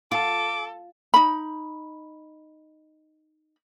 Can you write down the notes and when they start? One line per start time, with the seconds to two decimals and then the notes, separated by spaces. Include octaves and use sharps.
0.12 F4 A4 D6
1.14 D#4 B5